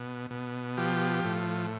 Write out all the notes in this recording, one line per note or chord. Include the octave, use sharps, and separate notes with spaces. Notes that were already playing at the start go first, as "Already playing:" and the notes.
Already playing: B2
B2
F3 G4
A2